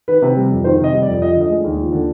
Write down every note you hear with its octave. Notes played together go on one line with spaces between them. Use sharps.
D#3 B4
C3
G3
F2
D#3 C5
C3
D#5
G3
D5
F2
F3 D#5
D3
D#5
G#3
D#2
F3
D3